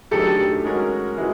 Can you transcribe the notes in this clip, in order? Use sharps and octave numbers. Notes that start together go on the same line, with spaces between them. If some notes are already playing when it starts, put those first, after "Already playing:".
F#2 D#3 F#3 A3 D4 G4 A4
G#3 C#4 F#4 A#4
E3 G#3 E4 F#4